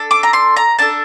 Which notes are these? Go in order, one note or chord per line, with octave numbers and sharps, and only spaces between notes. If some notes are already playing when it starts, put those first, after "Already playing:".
Already playing: D4 A4
D6
A#5
C6
A#5
D4 A4 A5